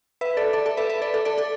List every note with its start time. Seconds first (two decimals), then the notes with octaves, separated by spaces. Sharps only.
0.21 B4 E5
0.37 A4 D5
0.53 A4 D5
0.66 A4 D5
0.77 B4 E5
0.89 B4 E5
1.02 A4 D5
1.14 A4 D5
1.25 A4 D5
1.38 A4 D5